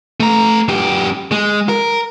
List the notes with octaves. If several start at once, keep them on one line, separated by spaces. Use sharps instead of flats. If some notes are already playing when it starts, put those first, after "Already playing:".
A3 A#5
F#2 G4
G#3
A#4